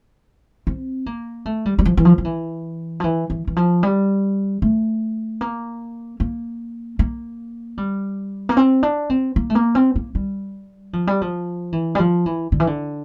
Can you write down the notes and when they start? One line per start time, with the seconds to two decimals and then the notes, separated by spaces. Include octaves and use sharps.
0.67 C4
1.06 A#3
1.45 A3
1.65 G3
1.79 G3
1.85 F3
1.97 E3
2.05 F3
2.18 F3
2.25 E3
3.00 F3
3.04 E3
3.30 E3
3.47 E3
3.56 F3
3.83 G3
4.62 A3
5.41 A#3
6.20 A#3
6.99 A#3
7.78 G3
8.49 A#3
8.57 C4
8.83 D4
9.10 C4
9.36 A#3
9.50 A3
9.55 A#3
9.75 C4
9.96 A#3
10.15 G3
10.93 F3
11.07 G3
11.21 F3
11.72 E3
11.95 G3
11.99 F3
12.26 E3
12.52 D3
12.60 E3
12.67 D3